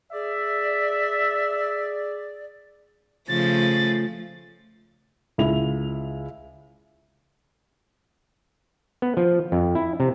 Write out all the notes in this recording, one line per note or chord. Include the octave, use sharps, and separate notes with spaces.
G#4 D5 E5
C#3 F3 A3 A6
C#2 E4 F7
B3
F3
F2
E4
C3